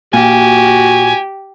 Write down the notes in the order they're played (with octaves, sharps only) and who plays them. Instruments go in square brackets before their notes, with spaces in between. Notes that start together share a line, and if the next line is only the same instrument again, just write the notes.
[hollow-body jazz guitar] A#2 [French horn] F#4 [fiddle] G4 [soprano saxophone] G#5